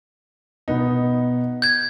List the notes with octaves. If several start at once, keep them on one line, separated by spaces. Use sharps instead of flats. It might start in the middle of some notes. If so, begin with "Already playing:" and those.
B2 B3 D#4
G6 G#6